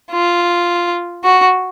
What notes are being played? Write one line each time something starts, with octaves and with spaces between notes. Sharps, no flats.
F4
F#4